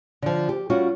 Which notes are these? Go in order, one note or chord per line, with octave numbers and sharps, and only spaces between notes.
D3 F3
G4
G3 C#4 F4 F#4